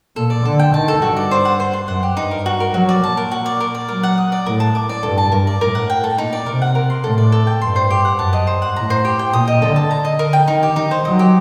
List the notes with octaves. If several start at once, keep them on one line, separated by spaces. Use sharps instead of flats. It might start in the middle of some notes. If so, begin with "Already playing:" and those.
A#2 A4
D5
D3 A4
G5
D#3 A5
A4
G2 F#4
D5
C5
F#5
C5
C6
F#2 F#5
G4
G2 D#4
A#4
F#4
A#4
F#3 F#4
D5
A#2 A5
A#4
F#4
D5
A#4
D5
F#3 A#4
F#5
D#6
D5
A2 A#4
A5
D6
D5
G2 A4
A5
G2 A#4
D5
A2 A#4
F#5
G5
A4
A#2 D#4
D5
C3 A#4
F#5
A#4
C6
A2 A4
D5
A4
G5
G2 C6
C5
G4
F#5
F#2 A5
D#5
G2 C5
F#5
A2 A#5
C5
G4
G5
A#2 D#6
D#5
D3 A4
A5
A#5
D#5
D3 A#4
G5
D#3 D#4
G4
D#3 D#4
C5
F#3 D#5
G4